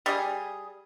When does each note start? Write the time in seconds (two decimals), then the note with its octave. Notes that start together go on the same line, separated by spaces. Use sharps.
0.06 G3 G#4